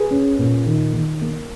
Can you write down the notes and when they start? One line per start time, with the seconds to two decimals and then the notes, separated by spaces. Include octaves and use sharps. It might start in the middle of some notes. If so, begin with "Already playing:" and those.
Already playing: G#4 B4
0.11 C#4
0.38 A#2
0.66 D#3
0.93 D#3
1.21 A#3